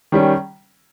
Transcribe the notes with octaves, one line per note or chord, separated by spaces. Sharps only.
D#3 G3 C#4